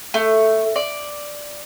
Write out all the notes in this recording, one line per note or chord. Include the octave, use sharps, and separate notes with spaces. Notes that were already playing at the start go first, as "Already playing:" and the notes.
A3
D5